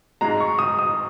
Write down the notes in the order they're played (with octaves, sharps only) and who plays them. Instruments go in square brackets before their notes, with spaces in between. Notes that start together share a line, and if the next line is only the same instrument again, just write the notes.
[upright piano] G#2 G#3 A#5
C#6
D#6
D#6